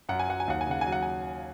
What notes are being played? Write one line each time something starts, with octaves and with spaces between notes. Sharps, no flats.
F#2 F#5
G#5
F#3 F#5
G#5
D#2 F#5
G#5
C#3 F#5
G#5
F#3
F#5
G#5